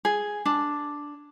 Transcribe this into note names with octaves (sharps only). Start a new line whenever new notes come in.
G#4
D4